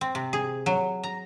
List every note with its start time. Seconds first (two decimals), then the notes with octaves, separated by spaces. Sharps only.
0.01 C4
0.15 C3
0.33 G#4
0.66 F#3
1.03 A#5